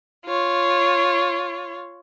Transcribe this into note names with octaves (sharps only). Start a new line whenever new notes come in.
F4 C#5